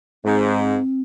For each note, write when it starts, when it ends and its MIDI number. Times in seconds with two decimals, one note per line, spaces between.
0.25 0.77 44
0.25 1.01 60